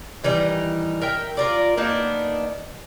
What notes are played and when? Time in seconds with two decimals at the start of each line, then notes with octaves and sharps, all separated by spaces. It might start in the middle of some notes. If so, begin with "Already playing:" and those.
0.24 D#3 E3 G3 D#4
1.01 A#4 E5 G5
1.37 F4 A#4 D5
1.77 A#3 B3 D4 D#4